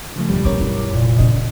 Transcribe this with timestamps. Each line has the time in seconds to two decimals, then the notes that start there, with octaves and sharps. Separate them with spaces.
0.16 C#3 F3 A3
0.30 B1 G2 G3
0.45 A#3 C#4 A#4 C#5 D6
0.60 E4
0.92 F1 A#2
1.18 C#3 D4 D#5